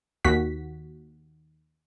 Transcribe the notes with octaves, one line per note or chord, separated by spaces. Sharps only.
D#2 F#4 B6